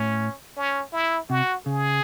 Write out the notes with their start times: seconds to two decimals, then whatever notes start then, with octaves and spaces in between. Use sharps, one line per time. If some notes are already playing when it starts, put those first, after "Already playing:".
Already playing: A2 C#4
0.57 C#4
0.93 E4
1.30 C3 F#4
1.66 C#3 G#4